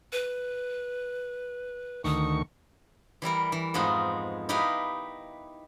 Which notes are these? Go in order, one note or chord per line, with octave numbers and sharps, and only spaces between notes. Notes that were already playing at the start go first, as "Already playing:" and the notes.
B4
D2 D#3 C#6 D#6
E3 G3 E4 A#4
E3
F2 G#2 F3 G#3 B3 D#4
D#4 E4 G4 B4 D#5 F5